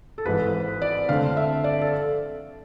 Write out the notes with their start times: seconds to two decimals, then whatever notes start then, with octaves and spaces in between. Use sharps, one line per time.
0.18 A4
0.26 G#1 G#2 E3 B4
0.82 D5
1.09 F2 D3 A3 C4 F5
1.37 E5
1.64 D5
1.81 A4